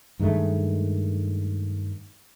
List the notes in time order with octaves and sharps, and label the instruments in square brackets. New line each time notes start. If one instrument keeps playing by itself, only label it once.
[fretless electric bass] G2 D#3 G#3 A3